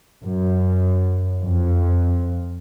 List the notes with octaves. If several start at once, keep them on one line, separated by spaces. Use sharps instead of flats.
F#2
F2